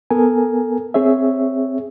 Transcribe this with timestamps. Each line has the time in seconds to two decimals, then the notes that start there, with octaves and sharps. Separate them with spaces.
0.10 B3 A4 A#4 G#5
0.94 C4 G#4 C#5 E5